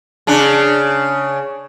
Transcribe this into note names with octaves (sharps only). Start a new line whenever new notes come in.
C#3 D4